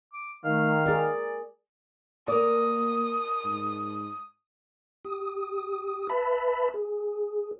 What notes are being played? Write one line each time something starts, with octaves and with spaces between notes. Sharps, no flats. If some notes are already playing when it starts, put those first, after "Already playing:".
D6
D#3 A3 F5
G#4 A#4 D5
A#3 A#4 D5 D#6
G#2
G4 D#6
B4 E5 A5 B5
G#4